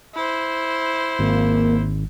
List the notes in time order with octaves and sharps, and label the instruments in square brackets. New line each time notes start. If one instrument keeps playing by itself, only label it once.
[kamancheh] E4 C5
[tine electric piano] G#1 [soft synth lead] A#3